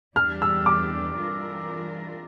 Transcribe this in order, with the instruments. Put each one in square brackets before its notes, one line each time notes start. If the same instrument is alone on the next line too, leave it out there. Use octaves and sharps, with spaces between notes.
[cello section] E2 E3 G3 D4 G4 [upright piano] F6
[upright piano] E6
D6
[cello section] E3 G3 D4 F4 A#4